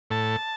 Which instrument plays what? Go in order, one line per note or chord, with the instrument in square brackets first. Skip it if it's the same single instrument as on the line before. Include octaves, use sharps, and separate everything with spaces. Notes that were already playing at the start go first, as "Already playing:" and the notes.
[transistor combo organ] A2 A5